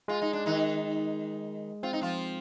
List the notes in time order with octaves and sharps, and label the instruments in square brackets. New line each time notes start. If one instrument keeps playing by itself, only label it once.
[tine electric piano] G#3 [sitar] F4
[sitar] D#4
D4
D#3 D#4
[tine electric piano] C4 [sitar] F4
[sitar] D#4
F3 F4